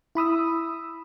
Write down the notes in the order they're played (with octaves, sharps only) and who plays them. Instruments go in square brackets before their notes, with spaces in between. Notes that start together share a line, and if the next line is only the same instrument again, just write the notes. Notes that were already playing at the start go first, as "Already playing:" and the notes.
[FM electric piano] E4 B5 D#6 E6